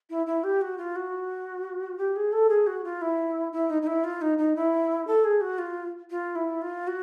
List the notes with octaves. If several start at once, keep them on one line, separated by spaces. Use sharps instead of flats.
E4
E4
G4
F#4
F4
F#4
G4
G#4
A4
G#4
F#4
F4
E4
E4
D#4
D#4
E4
F4
D#4
D#4
E4
A4
G#4
F#4
F4
F4
E4
F4
F#4